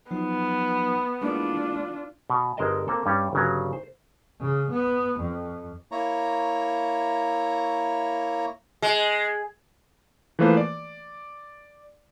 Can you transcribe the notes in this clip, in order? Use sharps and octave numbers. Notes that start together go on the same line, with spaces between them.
F3 F#3 B3 D#4
G#3 A#3 D4 E4 F4
B2
G1 G#3 A#4 C5 D#5 A5
A#3 C4 A4
G2 G3 C#4
G1 C#3 F#3
C5
C#3
B3
F2
A#3 E4 C#5 A#5
G#3
E3 F3 A3 A#3 B4 C5
D5